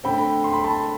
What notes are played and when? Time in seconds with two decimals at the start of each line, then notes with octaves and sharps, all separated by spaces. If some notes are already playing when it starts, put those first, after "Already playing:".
0.04 D3 A3 C4 G5 B5
0.44 C6
0.53 B5
0.64 A5 C6